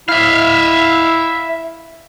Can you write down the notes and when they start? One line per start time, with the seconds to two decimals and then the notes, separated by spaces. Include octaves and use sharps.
0.09 E4 E5 F5